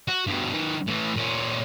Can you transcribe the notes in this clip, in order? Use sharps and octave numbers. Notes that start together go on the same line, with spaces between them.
F#4
G2 B2
D#3 B4
A2 E3
A#2 C#4